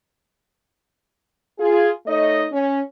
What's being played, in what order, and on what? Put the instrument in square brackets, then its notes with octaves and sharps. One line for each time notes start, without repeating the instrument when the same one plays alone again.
[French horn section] F4 G#4
A3 D#4 C#5 D#5
C#4